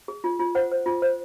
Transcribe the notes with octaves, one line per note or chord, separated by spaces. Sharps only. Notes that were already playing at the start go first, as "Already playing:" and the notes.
G#4
F4
F4
C5 F#5
C5
F4
C5